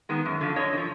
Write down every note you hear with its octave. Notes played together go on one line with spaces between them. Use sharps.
D#3 G#3 B3
F#2
D3 F3
F#2 C#5 D#5
D3
F3